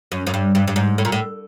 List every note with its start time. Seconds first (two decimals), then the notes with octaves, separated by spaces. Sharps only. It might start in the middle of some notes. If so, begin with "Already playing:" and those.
0.12 F#2
0.27 F#2
0.34 G2
0.55 G2
0.68 G2
0.76 G#2
0.98 A2
1.05 A#2
1.12 A2